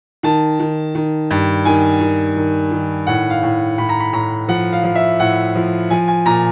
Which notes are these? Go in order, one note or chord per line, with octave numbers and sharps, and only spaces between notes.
D#3 A5
D#3
D#3
G2
D#3 G#5
D#3
D#3
D#3
A2 F#5
F5
A2
A2 B5
A#5
B5
A2 A#5
F3 F#5
F5
F3
E5
A2 F#5
F3
F3 G#5
G#5
A#2 A#5